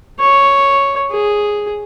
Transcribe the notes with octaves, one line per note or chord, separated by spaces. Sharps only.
C#5
G#4